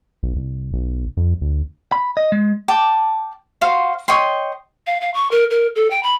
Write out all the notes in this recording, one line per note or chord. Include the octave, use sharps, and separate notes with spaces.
B1
C2
B1
F2
D2
B5
D#5
G#3
G5 A5 D6
F#4 C5 F5 C6
C#5 D#5 G5 C6
F5
F5
C#6
A#4
A#4
A4
G5
B5